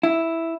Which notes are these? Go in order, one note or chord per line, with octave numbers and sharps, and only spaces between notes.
E4